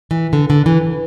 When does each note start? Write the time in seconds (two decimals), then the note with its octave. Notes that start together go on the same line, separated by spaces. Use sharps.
0.11 E3
0.33 D3
0.50 D3
0.66 E3